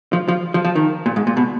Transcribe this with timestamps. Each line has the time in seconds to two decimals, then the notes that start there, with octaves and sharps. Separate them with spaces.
0.13 F3
0.28 F3
0.54 F3
0.65 F3
0.75 D#3
1.06 A#2
1.16 G#2
1.27 A#2
1.37 B2